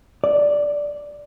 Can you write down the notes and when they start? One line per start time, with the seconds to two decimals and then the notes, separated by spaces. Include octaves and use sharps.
0.24 D5